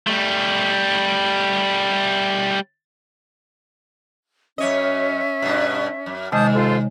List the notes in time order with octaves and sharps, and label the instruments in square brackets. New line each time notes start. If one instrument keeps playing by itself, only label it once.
[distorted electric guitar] G3 A3
[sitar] F#2 C#5 D#5 [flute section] C#4 E5
[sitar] G2 B2
F#2
[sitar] D#2 [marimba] C3 G#3 D#5 [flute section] A5 D#6 G6
[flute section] F4 A4 C5